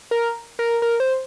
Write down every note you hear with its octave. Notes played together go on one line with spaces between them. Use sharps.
A#4
A#4
A#4
C5